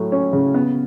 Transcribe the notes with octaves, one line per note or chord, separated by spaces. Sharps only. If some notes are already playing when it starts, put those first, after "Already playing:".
Already playing: A2 F#3 A3
C#4
C#3
B3